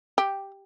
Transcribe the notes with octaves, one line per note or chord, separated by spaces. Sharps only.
G4